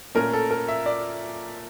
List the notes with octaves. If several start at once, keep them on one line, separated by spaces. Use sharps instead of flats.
A#2 A3 C#4 A#4
A4
A#4
E5
D5